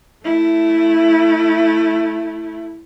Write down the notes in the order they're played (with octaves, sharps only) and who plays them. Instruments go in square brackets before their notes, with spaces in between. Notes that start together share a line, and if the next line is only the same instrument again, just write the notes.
[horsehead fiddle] A3 E4